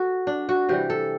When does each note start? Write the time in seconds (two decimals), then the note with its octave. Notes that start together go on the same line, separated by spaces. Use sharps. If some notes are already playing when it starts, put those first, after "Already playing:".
Already playing: F#4 A4
0.27 D4
0.49 F#4
0.69 C3 E3 G3 G4
0.90 A4